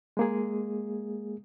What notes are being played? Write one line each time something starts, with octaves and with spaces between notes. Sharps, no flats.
G#3 A#3 G#4